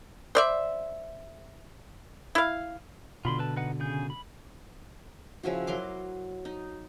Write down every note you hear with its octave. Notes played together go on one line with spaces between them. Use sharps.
C5 D5 E5
E4 F5
B2 D3 F4 B5 C6
A4 B4 A5
D#4 B4 F#5
C#3 G#4 G6
B5
C#3 F3 E4 F#4
F#3 A#4 C6 D6
D#4